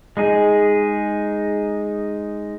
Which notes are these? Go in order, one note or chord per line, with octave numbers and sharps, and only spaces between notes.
G#3 D#4 G#4